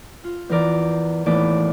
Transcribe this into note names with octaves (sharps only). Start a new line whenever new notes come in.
F4
E2 E3 A#4 D5
D#2 A2 E3 B3 D#4 D5